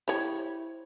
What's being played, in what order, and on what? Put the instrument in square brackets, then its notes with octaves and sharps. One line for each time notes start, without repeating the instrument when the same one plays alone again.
[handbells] E4 C5 [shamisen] G4 C#5